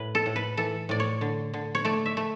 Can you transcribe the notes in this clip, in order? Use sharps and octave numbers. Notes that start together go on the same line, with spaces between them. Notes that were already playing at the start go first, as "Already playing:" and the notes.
Already playing: A2 B4
A4
A2
B4
E3 A4
A2 D5
C#5
D3
D3
C#5
A3 D5
E5
A3